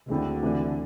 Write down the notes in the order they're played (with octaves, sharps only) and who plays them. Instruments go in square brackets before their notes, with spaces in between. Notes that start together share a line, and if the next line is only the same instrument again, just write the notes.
[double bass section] D2 D3 [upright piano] G#3 C4 E4
[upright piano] C3 E3 A3 D4